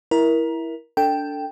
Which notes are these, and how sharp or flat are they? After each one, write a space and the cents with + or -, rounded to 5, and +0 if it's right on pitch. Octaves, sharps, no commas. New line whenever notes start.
E4 +0 A#4 +20
D4 -15 A4 +20 G5 +0